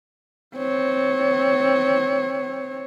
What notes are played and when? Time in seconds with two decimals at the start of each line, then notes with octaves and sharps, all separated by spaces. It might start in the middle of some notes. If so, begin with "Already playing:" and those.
0.56 C4 C#5